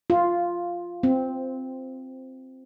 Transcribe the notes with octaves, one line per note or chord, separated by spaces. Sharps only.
F4
C4